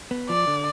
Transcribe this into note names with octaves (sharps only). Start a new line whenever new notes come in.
B3
F3 D5
D3